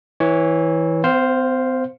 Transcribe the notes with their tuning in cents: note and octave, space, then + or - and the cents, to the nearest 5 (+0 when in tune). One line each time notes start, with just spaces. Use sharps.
E3 -15 C#5 +0
C4 -45 C5 +0 F5 +0